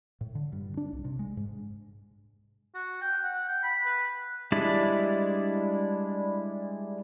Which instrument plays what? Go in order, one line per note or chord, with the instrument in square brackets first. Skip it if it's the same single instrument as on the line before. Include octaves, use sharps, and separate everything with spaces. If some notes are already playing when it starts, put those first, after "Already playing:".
[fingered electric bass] A2
D3
G2
D4
C2
C3
G#3
G#2
[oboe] F#4
G5
F#5
G5
B5
B4
[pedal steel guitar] G3 G#3 D4 E4 D5